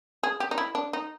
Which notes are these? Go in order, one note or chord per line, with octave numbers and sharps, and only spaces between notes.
G#4
G4
D#4
E4
D4
D#4